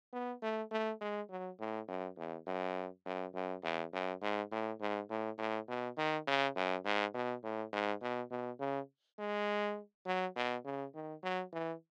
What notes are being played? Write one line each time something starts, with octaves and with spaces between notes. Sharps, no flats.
B3
A3
A3
G#3
F#3
A2
F#2
E2
F#2
F#2
F#2
E2
F#2
G#2
A2
G#2
A2
A2
B2
D#3
C#3
F#2
G#2
B2
A2
G#2
B2
B2
C#3
G#3
F#3
B2
C#3
D#3
F#3
E3